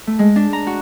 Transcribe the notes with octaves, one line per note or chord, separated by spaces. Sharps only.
A3
G#3
D4
A#5
F#4